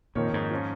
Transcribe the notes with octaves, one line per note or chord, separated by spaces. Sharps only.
F2 A#2 D#3 A#3 D#4 C#5
G#2
F3 C#4 F4